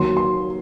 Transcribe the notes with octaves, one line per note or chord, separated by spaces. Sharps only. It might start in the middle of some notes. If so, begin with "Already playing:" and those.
Already playing: D#2 D#3 F#3 C6
C6